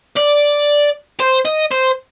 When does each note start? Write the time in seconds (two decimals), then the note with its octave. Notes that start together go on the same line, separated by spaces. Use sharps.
0.17 D5
1.20 C5
1.45 D#5
1.72 C5